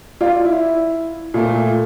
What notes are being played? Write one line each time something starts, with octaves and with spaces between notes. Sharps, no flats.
F4 D5
E4
A#2 A3